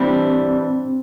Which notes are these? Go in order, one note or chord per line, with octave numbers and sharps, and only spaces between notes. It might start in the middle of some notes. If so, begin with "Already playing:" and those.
Already playing: E3 G3 C4 D4